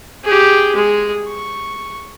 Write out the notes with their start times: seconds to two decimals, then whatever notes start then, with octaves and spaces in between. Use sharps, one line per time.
0.24 G4 G#4
0.75 G#3 G#4
1.26 C#6